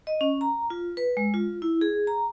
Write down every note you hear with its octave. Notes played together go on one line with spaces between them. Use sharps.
D#5
C#4
A#5
F4
B4
G#3
F4
E4
G#4
A#5